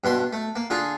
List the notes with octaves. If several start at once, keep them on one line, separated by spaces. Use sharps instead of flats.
G2 B2 C6
A3
A#3
D3 F4 G#4